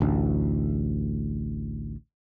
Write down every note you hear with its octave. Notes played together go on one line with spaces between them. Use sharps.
A1 D2